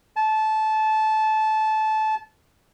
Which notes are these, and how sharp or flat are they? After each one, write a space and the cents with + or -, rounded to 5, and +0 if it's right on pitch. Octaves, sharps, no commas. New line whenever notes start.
A5 -20